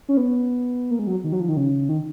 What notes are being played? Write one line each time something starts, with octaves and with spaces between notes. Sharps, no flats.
C#4
B3
A#3
G#3
F#3
D#3
F#3
F3
D#3
C#3
D#3